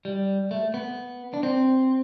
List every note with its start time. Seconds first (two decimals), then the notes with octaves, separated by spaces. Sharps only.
0.05 G3
0.51 A3
0.74 B3
1.34 D4
1.43 C4